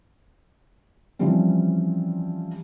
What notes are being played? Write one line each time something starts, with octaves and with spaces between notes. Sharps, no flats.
E3 F3 G3 C4 C#4